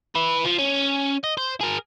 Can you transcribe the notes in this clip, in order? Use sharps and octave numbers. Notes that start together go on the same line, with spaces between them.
E4 B4
F3
C#4
D#5
C5
G#4 A#4